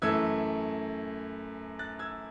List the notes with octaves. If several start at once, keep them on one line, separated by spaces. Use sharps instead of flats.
F#2 E3 A3 E6 G#6
F#6 A6
E6 G#6